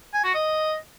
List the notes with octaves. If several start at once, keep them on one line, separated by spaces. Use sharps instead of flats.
G#5
F#4
D#5